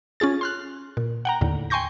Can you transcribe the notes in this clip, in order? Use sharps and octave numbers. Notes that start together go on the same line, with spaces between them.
C#4 F4 G#4 A6
C6 F6 F#6
A#2
F#5 G5 A#5
D#2 A2 D3
G5 G#5 C6 C#6 G6 A#6